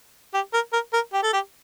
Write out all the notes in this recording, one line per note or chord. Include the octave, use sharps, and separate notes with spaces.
G4
A#4
A#4
A#4
G4
A4
G4